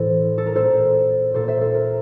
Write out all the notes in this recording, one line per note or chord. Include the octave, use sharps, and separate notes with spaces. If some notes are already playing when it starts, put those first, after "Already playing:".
Already playing: A2 E3 A4 C5
A4
A#4
A#2 A4 C5
A#2 A4 C5
C5 E5
A4 C5
A#4